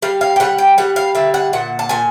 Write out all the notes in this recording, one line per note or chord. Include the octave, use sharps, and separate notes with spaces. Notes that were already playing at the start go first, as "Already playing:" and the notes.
G3 F5
F5
G5
G3 F#5
G5
G3 F#5
F5
D3 E5
F#5
A#2 F#5
A5
A#2 G#5